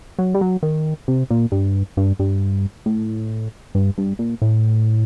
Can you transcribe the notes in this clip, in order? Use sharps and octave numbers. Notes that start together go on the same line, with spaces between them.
F#3
G3
F#3
D#3
C3
A#2
G2
G2
G2
A2
G2
G2
A#2
A2